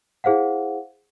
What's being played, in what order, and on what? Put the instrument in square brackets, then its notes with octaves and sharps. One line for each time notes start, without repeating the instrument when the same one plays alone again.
[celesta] E4 G#4 C5 F5 F#5